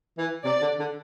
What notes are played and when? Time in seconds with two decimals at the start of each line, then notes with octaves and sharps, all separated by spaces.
0.18 E3
0.44 C3 D5
0.61 D3
0.79 D3